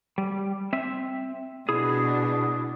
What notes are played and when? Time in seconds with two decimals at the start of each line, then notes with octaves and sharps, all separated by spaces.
0.18 G3
0.73 C4 E5
1.69 B2 D4 E4 G#4